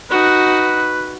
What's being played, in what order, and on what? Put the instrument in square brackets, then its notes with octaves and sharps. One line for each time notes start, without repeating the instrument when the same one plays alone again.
[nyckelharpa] D#4 F#4 [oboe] B4